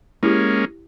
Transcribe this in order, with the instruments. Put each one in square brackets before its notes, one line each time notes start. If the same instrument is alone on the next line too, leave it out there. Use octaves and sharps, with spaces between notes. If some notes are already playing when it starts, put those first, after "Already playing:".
[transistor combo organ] G#3 A#3 C#4 [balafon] E4 G4